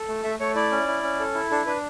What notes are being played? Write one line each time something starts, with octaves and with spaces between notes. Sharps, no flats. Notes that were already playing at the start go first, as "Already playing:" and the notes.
Already playing: A4
A3
A3 E5
A3 C#5
E4 D5
C#4
E4
C#4
A4
E4
D4 A4
D4 B4